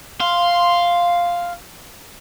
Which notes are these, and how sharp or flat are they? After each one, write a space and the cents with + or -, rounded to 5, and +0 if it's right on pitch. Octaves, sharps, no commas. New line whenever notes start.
F5 +0 C6 +0